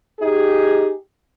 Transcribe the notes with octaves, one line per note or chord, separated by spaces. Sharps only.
D#4 G4 G#4